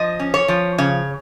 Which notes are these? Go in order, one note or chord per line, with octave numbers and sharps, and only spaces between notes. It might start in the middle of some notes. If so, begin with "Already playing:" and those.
Already playing: F3 D#5
C#4
C#5
F3
C#3 C#5